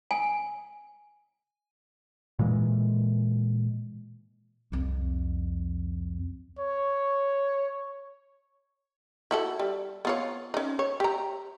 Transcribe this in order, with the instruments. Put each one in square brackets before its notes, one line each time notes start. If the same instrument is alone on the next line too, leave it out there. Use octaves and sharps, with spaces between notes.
[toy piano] G#5
[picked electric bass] A#2 E3 G#3
[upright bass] C2 F2
[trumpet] C#5
[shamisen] E4 F#4 A4
G3
B3 F4 C#5
C#4 D#4
C#5
G4 A#5